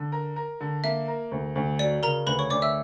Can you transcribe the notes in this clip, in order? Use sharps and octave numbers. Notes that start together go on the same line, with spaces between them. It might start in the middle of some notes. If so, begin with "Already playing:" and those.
Already playing: D3
A#4
A#4
D3
A#3 E5
A#4
D2
D2
F#3 D5
C#3 A#4 A#5
D2 B4 B5
C#5 C#6
D2 D5 D6
E5 E6